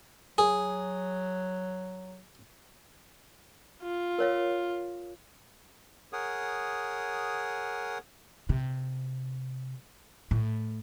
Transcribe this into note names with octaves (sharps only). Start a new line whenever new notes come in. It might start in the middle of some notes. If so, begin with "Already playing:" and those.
F#3 G#4
F4
A#4 C#5 F5
G#4 A#4 C#5 F#5 D#6
C3
A2